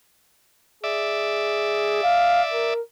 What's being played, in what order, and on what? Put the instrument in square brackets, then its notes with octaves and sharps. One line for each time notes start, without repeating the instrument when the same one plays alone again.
[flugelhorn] G#4 [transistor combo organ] D5 E5
[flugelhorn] F5
A#4